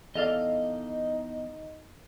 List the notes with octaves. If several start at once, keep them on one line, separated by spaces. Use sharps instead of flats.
E2 D#4 A4 D5 D#5 F5